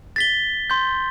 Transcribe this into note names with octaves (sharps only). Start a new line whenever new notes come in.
A6 B6 G7
C6 G6